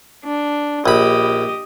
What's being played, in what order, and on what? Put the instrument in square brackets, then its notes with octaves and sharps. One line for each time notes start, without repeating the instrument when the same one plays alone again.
[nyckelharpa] D4
[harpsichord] A#1 B5 [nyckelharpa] G4 D#5